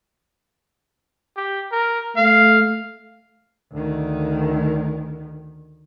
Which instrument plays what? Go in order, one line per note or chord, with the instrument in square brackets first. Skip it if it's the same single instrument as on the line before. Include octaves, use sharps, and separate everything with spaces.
[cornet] G4
A#4
[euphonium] A3 [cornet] F5
[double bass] D2 D#3